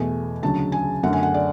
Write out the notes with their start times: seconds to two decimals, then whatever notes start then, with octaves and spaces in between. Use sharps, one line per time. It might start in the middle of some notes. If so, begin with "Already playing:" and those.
Already playing: E2 B2 A3 G#5
0.43 D2 C#3 F#3 A5
0.72 G#5
1.03 F#2 D3 A3 F#5
1.13 G#5
1.23 F#5
1.34 D5